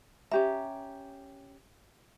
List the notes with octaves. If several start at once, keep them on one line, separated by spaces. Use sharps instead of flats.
C#4 G4 E5 A#5